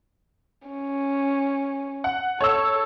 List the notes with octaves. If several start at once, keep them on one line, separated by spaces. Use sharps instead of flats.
C#4
F#5
A4 C#5 E6